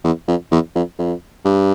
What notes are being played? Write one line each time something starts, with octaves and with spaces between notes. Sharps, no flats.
E2
F2
E2
F2
F2
G2